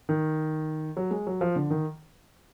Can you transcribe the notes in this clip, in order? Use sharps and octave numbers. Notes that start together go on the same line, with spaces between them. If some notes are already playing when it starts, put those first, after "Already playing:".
D#3
F#3
G#3
F#3
F3
D3
D#3